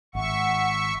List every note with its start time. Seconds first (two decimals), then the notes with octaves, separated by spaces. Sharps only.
0.15 G#1 E5 F#5 C#6